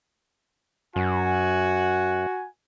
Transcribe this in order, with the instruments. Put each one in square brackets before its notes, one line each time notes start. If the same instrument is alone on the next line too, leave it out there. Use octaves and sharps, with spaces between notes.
[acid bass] F#2 [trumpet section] F#4 F#5 G#5